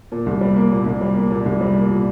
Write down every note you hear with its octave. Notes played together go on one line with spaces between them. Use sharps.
A#2
C2
G3
A#3
A#2
C2
G3
A#3
A#2
C2
G3
A#3
A#2